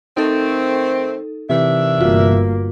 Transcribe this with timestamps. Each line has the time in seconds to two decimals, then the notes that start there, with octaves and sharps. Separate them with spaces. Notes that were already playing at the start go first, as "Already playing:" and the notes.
0.17 D#3 A3 C4 D#4 A4
1.50 C3 D#3 E3 D4 E5
2.01 G1 A#3 F4 F#4